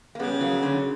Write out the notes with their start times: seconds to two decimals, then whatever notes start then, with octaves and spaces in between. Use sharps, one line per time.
0.15 A#3
0.19 C#3 G3 B3
0.41 F#3 A#3
0.63 D3 F#3